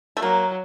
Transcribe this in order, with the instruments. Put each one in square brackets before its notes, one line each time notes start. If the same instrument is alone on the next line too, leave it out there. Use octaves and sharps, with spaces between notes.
[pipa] A3
[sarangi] F#3 [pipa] A#3